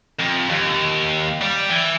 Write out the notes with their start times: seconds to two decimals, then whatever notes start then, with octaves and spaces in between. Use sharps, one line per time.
0.20 F2
0.50 D#2
1.42 G3
1.70 E3